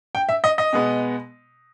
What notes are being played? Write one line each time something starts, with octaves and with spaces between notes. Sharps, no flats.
G5
E5
D#5
D#5
B2 G#3 B3